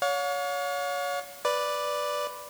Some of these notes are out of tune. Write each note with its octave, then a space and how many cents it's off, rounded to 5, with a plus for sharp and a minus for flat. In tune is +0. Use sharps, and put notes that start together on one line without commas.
C#5 +30 F5 +45
B4 +0 D5 +0